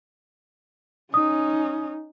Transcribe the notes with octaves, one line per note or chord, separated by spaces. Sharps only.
C#4 D#4 D#6